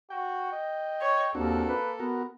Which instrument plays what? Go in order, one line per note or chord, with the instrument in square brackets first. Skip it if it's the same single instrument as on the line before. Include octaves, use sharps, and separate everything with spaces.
[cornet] F#4 [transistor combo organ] G5
[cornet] D#5
[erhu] C#5
[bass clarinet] D#2 [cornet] A#3 [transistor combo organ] C4 D4 F#4 [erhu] A4
[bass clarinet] B4
[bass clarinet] B3 [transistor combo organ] F#4 A#4